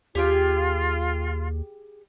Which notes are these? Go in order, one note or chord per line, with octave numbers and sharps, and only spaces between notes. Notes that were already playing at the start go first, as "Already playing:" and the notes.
D#2 F4 G4 G#4 G5